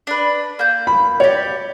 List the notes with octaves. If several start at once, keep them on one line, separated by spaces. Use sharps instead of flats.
D4 B4
A#3 G6
B5
G4 C#5 D5